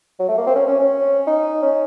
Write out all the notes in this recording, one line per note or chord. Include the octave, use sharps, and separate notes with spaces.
F#3
A3
A#3
C4
C#4
C#4
C#4
D#4
C#4